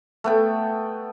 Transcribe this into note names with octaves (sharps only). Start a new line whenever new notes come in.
A3 B3 G5